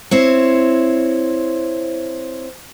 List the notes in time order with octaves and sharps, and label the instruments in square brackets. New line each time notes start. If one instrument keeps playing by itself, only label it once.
[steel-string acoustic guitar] C4 E4 C#5